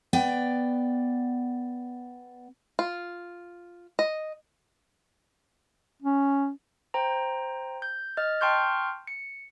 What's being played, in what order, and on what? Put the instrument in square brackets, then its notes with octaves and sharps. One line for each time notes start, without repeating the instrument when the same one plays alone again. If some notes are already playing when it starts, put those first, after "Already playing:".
[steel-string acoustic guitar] B3 D5 G5
[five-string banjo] F4
D#5
[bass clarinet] C#4
[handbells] C5 G5 A#5
G6
D#5 F6 A6
G5 A5 C6 C#6 F6 G6
C#7